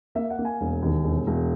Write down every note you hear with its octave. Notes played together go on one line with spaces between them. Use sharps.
A#3 E5
F#5
A#3
G#5
E1
D#2
E1
E1